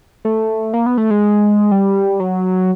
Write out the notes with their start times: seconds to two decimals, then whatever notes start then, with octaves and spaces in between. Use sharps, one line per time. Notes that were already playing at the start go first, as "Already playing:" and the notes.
0.25 A3
0.73 A#3
0.86 B3
0.97 A3
1.10 G#3
1.71 G3
2.20 F#3